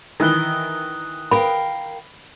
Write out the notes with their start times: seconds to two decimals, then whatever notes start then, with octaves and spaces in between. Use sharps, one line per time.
0.20 D#3 E3 D#6 F#6 G7
1.31 A#4 F5 G5 B5